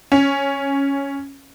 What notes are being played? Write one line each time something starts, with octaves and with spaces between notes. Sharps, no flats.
C#4